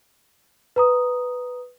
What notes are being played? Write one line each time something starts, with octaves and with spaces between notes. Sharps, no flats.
B4 A#5 D#6